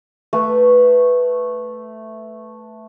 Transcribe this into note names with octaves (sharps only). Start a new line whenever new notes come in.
A3 B4